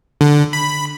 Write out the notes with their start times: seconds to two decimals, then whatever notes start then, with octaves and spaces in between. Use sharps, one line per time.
0.21 D3
0.53 B5